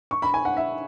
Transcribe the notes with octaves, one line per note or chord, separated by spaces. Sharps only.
C#6
B5
G#5
F#5
E5